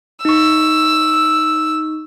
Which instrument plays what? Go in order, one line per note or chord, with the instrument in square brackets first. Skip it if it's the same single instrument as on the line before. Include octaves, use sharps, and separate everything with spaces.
[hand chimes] D#4 C#6 [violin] E6